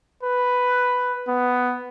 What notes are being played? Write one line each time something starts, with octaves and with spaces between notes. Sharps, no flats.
B4
B3